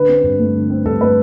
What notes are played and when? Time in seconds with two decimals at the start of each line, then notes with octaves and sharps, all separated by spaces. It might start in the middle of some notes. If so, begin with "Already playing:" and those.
Already playing: D3 B4
0.08 C4
0.24 G2
0.39 A3
0.55 D3
0.70 C4
0.85 G2 A4
1.01 A3 B4